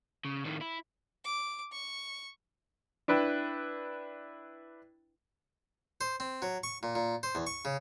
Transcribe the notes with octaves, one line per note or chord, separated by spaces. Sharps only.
C#3
A2 D#3
E4
D6
C#6
D4 E4 B4 G5
C5
C4
F#3
C#6
A#2
A#2
C5
E2
C#6
C#3